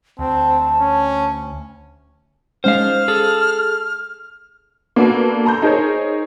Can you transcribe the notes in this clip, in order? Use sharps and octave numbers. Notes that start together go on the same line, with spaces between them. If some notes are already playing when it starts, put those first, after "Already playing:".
D2 C4 A5
C#4
G#3 C#4 C5 F5 F#5 F6
G#4 A4
A#3 B3 D4 F#4 A4 B4
A4 A#5 C6 G6
D#4 G#4 A#4 C5 C#5